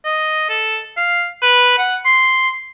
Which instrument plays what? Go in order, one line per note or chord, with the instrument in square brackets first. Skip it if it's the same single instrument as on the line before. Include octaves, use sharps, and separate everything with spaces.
[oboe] D#5
A4
F5
B4
F#5
C6